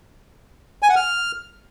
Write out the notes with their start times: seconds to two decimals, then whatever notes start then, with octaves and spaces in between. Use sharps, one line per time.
0.83 G#5
0.89 F#5
0.96 F6